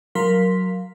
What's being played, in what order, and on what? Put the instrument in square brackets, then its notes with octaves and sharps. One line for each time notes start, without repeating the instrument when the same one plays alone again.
[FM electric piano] F#3 A#4 F5 C6 B6